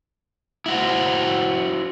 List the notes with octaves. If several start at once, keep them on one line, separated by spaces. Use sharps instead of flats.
E4 F#4 C5